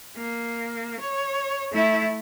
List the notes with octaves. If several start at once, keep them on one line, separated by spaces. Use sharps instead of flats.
A#3
C#5
A3 E4